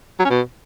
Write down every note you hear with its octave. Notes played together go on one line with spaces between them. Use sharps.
F#3
C#4
B2